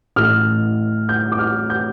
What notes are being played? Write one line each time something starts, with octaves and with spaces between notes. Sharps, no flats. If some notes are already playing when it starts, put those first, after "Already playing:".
A1 A2 A3 F6
G6
D6
F6
G6